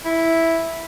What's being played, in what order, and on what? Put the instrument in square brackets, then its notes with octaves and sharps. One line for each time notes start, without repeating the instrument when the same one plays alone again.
[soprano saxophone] E4